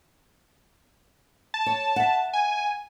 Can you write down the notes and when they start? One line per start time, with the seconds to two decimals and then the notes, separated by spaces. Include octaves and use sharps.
1.54 A5
1.66 C#5
1.96 E5 F#5
2.33 G#5